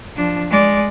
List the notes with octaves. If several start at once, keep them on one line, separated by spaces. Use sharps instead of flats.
F3 D4
G#3 D5